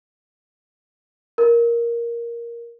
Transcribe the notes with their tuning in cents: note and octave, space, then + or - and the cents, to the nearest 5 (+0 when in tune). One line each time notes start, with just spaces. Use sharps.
A#4 +5